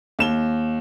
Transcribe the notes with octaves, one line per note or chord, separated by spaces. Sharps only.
D#2 E7 G7